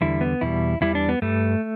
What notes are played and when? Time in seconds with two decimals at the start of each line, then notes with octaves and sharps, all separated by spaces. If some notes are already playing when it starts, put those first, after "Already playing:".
0.01 E2 D3 G3 E4
0.21 B3
0.41 E2 B2 G3 E4
0.81 E2 E3 G3 E4
0.95 D4
1.09 B3
1.22 G2 G3 A3